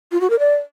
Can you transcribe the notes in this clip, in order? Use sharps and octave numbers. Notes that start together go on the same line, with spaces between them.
F4
F#4
A#4
D5